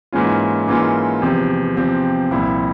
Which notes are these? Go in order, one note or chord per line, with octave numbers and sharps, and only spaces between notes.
G#2 E3 A#3 C#4 F4
G#2 E3 A#3 C#4 F4
E2 C3 F3 C4 G4
E2 C3 F3 C4 G4
C2 A#2 F3 C4 E4